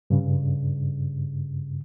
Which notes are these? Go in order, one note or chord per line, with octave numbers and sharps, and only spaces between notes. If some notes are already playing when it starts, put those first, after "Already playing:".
G2 C#3